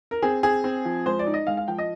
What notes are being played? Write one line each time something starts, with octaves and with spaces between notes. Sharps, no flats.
A#4
C4 G#4
C4 G#4
C4
F3
G#3 C5
D5
D#4
D#5
G#3 F5
F5
F3 G5
D#5